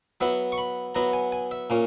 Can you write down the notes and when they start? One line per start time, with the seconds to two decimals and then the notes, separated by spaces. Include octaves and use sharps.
0.21 F#3 B3 E4 E5
0.52 C#6
0.58 B5
0.95 F#3 B3 E4 A#5
1.13 G#5
1.32 G#5
1.51 E5
1.70 A#2 A#3 C#4